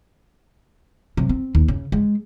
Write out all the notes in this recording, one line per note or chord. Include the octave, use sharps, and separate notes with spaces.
C3 F#3
C4
D#2
C#3
G#3